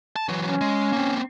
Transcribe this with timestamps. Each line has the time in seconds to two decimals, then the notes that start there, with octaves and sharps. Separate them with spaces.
0.16 A5
0.29 E3 F#3
0.48 C#4
0.61 G#3
0.93 A#3 C4